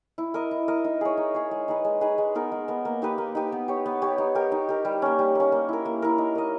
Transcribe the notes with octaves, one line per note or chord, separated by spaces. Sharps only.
E4
A#4 D#5
E4
A#4 D#5
D#4
G#4 C#5
D#4
G#4 C#5
G#3
D#4 G#4 B4
G#3
D#4 G#4 B4
G#3
B3 D#4 A#4
G#3
B3 D#4 A#4
A#3
D#4 G4 B4
A#3
D#4 G4 B4
B3
G4 C#5
B3
G4 C#5
D#4
G4 A#4
D#4
G4 A#4
G3
A#3 C#4
G3
A#3 C#4
A#3
E4 A#4
A#3
E4 A#4
D#4
A#4 D#5